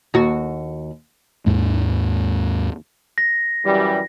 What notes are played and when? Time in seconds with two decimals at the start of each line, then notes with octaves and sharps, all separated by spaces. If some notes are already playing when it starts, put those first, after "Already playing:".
0.14 D#2 F#4
1.46 D#2 G#2 G#3
3.18 A#6
3.64 F#2 E3 G3